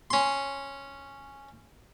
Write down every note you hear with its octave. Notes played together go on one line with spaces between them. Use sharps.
C#4 C6